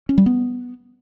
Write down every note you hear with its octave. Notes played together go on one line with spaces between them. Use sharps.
C#4
G3
B3